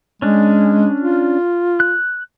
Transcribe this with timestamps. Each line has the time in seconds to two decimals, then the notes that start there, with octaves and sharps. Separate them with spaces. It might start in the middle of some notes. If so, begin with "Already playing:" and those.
0.22 G#3 C#4 D4
1.00 F4
1.80 F#6